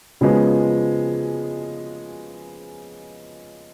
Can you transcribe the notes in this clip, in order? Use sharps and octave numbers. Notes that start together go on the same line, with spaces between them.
C#3 F3 G#3 B3